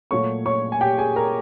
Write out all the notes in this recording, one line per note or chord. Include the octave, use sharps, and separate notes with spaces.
A#2 F#3 A3 C#5 C#6
C#5 C#6
G#5
G4 G5
G#4 G#5
A#4 A#5